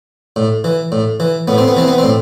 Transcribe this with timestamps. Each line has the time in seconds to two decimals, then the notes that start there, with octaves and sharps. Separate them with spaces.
0.36 A2
0.64 E3
0.92 A2
1.20 E3
1.48 A2 B3
1.58 C4
1.68 B3
1.76 E3 C4
1.88 B3
1.98 A2 C4